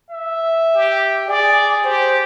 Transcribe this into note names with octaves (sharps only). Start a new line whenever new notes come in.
E5
G4
G#4 D5
G4 C5